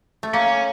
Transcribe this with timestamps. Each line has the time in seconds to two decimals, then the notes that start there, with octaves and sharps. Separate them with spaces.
0.23 A3
0.33 A#3 C#4